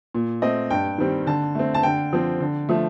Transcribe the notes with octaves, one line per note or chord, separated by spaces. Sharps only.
A#2
A3 C4 D#5
G2 G5
D#3 G3 C4
D3 A5
A3 C4
A5
D3 G5
F3 C4
D3
F3 A3